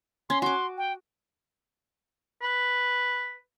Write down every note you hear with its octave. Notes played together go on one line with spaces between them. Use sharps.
C#4 C6
F#4 C6 D6
G5
B4